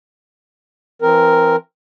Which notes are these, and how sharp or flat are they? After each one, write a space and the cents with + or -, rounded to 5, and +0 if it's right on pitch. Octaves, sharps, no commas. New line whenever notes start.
E3 +30 C4 +0 A#4 +0